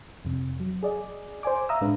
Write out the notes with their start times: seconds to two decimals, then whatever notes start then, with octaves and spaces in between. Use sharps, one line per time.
0.25 F2 C3
0.60 F#3
0.83 G#4 D5 D#5
1.43 C5 D5 G#5 D6
1.69 E5 F5 A#5 D#6 E6
1.81 A2 G#3 D4 B4